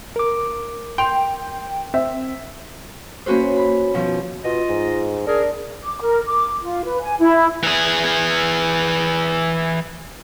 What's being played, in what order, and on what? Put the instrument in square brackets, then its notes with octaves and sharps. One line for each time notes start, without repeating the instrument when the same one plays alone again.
[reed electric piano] A#4 D6
[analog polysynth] G5 [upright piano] C6 F7
[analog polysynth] C4 [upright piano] E5
[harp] A#3 C#4 F#4 B4 C5
B5
B2 D#3 F3
[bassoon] B2 [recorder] F4 [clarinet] D#5
[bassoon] G#2
[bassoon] D4 [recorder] G#4 [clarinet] A#4
[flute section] D6
A#4
D6
F4
B4
G#5
E4
[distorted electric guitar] E3 G#4